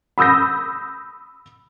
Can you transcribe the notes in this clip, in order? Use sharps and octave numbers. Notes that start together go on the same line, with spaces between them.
B5 D#6 E6 G6 A#6